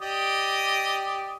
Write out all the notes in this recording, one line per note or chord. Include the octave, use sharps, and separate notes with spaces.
G4 D5 D#5